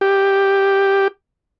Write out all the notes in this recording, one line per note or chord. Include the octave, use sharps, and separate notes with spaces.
G4